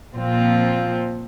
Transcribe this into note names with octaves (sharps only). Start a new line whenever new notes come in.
A#2 F3 C4 F4